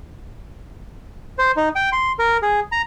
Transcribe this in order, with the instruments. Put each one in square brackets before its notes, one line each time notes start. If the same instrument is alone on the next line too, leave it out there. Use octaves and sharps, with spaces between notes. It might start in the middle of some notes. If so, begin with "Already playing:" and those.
[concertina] C5
D#4
G5
C6
A#4
G#4
A#5